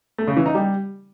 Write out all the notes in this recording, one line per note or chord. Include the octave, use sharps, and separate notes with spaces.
A3
C#3
E3
D#4
G3